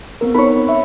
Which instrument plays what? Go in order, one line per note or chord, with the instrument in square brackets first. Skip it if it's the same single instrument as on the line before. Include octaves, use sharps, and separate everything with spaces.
[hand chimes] B3 C4 A#4
[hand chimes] D#4 [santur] B4 C#5
[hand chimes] E5